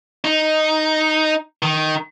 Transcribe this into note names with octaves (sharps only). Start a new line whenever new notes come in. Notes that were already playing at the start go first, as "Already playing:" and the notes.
D#4
D#3